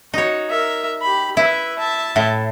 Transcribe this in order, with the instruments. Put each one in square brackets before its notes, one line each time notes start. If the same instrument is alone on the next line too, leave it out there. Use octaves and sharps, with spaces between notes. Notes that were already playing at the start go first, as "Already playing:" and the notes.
[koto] D#4 C#5 [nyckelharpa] F#4
[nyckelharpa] A#4 E5
G4 B5
[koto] E4 [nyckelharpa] B4 E5
[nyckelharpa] E5 A5
[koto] A2